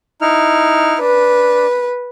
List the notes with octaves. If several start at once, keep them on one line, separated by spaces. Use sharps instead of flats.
D#4 E4 F6
D4 B4